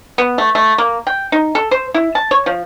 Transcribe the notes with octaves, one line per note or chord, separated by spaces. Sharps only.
B3
A3
A3
A#3
G5
D#4
A4
C5
E4
A5
C#5
F3